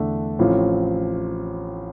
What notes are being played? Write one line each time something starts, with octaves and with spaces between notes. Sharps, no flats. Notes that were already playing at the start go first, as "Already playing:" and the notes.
Already playing: E2 D3 A3 D4 A4
A1 A2 F3 C4 F4